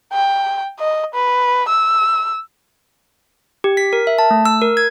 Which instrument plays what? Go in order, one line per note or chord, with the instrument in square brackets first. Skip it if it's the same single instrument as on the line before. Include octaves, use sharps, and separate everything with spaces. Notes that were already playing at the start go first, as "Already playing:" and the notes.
[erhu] G5
D#5
B4
E6
[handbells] G4
B6
A#4
E5
A5
A3
E6
A#4
G#6